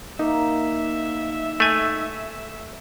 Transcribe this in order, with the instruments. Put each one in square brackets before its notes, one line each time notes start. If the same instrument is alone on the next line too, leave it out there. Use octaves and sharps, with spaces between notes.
[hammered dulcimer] A#3 [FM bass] D#4 [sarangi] E5
[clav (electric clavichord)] A3 G#5